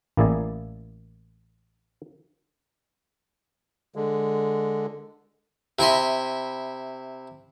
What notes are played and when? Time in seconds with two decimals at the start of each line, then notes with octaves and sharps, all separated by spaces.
0.17 A1 A#3 E4 G#4 D5 G#5
3.95 D3 G#3
5.79 C3 E4 D#5 C6